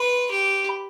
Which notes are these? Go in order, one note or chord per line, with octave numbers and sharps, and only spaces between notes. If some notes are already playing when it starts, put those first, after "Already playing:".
Already playing: B4 C6
G4
B5